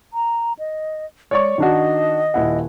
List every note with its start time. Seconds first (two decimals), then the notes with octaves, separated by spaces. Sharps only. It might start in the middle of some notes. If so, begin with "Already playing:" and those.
0.13 A#5
0.59 D#5
1.31 G#3 C#5 D5 C#6
1.58 D#3 D4 F#4 D#5
2.34 D#1 E4 F#5